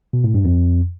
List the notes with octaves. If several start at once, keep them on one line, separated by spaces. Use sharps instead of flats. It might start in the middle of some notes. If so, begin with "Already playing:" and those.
B2
A2
G2
F2